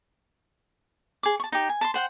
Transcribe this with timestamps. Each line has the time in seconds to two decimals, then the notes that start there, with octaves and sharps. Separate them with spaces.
1.23 G#4 D6
1.40 A5 C#6
1.52 D#4 G4
1.69 G#5
1.81 A5 A#5 C6
1.94 C5 F#5 G5